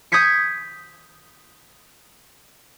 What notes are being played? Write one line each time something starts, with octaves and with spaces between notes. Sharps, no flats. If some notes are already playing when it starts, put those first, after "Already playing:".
D#6 G6 G#6 B6 C#7